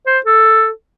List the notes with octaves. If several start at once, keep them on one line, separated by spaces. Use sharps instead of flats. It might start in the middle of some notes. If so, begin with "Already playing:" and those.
C5
A4